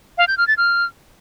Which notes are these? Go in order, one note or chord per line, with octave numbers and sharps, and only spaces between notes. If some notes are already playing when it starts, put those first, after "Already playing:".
F5
G6
F6
A6
F6